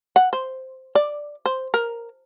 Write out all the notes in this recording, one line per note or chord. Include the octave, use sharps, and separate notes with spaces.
F#5
C5
D5
C5
A#4